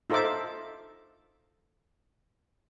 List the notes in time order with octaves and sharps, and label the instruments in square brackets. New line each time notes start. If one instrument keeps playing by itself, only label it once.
[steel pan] D#4 F4 A4 C5 E5 D6